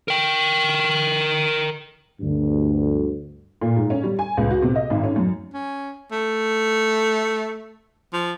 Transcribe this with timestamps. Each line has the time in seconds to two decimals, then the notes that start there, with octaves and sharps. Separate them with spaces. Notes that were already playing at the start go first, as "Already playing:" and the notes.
0.08 A#4 G5
2.21 D2 G2
3.62 A#2
3.76 G#2
3.90 C#4
4.04 G3
4.19 G#5
4.37 C#2
4.51 F#4
4.62 C3
4.76 D#5
4.90 G#1
5.04 C#4
5.16 F#2
5.53 C#4
6.12 A3
8.13 F3